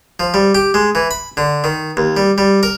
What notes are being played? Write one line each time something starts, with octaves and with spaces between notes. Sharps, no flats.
F3
G3
G4
G#3
E3
B5
D3
D#3
D#2
G3
G3
A#4